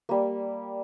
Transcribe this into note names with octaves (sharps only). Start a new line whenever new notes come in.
G3 A#3